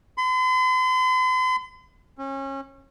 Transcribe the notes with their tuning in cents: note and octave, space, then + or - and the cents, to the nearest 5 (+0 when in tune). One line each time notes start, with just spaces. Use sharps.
C6 -45
C#4 -30